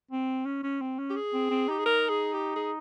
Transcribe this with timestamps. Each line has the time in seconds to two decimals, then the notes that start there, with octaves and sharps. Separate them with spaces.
0.11 C4
0.46 C#4
0.63 C#4
0.81 C4
0.99 C#4
1.10 G4
1.16 G#4
1.34 C4
1.51 C4
1.68 D#4 G4
1.78 G#4
1.86 A#4
2.09 G#4
2.33 G4
2.56 G#4